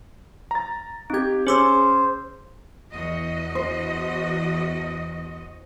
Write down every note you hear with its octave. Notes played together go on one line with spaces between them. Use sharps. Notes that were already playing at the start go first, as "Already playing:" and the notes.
A#5 A6
C4 D#4 G4 G#6
C#4 G#4 C5 D6 E6
E2 F#4 D#5
C5